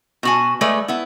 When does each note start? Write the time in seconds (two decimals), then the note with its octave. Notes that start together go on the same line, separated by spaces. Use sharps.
0.23 B2 F#4 G#5
0.61 G#3 A3 B4 D5
0.88 B3 E4